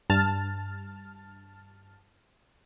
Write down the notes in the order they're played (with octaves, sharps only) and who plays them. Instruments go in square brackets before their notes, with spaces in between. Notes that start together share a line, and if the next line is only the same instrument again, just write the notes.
[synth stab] G2 A5 F6 A6